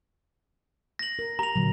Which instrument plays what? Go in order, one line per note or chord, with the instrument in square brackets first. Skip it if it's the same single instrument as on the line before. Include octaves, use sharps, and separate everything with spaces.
[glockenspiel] A#6 F#7
[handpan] A#4
[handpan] G4 [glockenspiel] A#5 F7
[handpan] A#2 D3 F#3